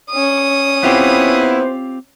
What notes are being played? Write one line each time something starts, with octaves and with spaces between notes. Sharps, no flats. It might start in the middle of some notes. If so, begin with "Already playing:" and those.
C#4 D#6
B3 C4 E4 F4 G4 C5